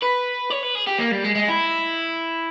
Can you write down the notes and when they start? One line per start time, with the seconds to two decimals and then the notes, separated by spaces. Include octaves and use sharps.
0.03 B4
0.51 C#5
0.63 B4
0.75 G#4
0.87 G4
0.99 A#3
1.12 G3
1.24 G#3
1.35 G#3
1.48 E4